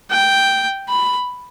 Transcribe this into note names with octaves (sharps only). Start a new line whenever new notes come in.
G5
B5